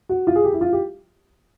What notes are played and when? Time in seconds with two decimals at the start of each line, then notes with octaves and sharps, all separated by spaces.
0.09 F#4
0.27 F4
0.36 G#4
0.44 G4
0.53 E4
0.61 F4
0.73 G4